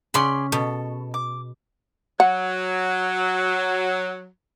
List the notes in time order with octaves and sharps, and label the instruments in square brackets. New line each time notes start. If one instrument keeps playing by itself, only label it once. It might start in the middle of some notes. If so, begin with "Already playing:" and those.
[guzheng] C#3 B5 [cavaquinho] G#4 D5 C6
[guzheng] B2 [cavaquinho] A4
[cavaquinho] D6
[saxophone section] F#3 [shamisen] F#5